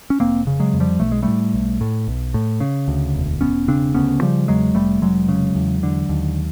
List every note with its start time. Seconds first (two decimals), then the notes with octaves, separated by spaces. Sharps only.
0.10 C#4
0.20 F1 A#3 C4
0.47 C#3
0.60 F#3 G#3
0.74 F2
0.80 F3 G3
1.00 B1 A3
1.12 G#3
1.22 A2 G3 A3
1.54 B1
1.81 A2
2.08 B1
2.34 A2
2.60 C#3
2.88 D2
3.14 E1
3.41 E1 B3 C#4
3.68 C#3 C4 D4
3.94 D2 B3 C#4
4.21 C#3 F3 G3
4.48 E2 F#3 G#3
4.75 F1 G3 A3
5.02 F1 F#3 G#3
5.29 C#3
5.55 E2
5.83 D3
6.09 D#2